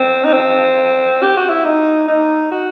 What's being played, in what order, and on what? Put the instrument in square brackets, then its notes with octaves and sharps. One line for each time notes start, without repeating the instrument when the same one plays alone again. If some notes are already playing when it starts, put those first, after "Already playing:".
Already playing: [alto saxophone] C4
D#4
C4
G4
F#4
E4
D#4
D#4
F#4